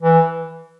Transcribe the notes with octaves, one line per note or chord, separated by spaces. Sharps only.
E3